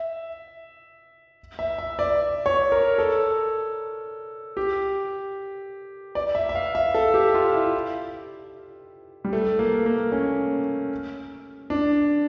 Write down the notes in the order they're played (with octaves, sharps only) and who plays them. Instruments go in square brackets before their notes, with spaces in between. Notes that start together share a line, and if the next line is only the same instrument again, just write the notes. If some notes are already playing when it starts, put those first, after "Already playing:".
Already playing: [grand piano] E5
E5
E5
D5
C#5
A#4
A4
G4
D5
E5
E5
F5
E5
A4
G4
F4
E4
G3
A3
A#3
A#3
C#4
D4